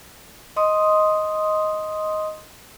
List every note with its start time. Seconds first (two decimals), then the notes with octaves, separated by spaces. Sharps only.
0.56 D#5 C6 D#6